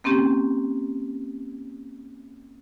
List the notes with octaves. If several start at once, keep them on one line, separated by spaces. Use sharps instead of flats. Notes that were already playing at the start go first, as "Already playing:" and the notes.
A#3 C4 C#4 G4